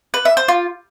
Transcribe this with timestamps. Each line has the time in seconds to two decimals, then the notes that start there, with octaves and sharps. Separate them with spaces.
0.14 B4
0.25 E5
0.37 C5
0.48 F4